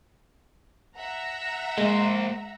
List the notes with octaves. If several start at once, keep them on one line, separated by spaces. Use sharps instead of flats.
E5 F#5 A#5
G#3 A#3 C5